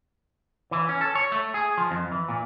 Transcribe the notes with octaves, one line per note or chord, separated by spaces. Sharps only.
E3
C#4
A4
C#5
A3
G#4
F3
F2
E3
A#2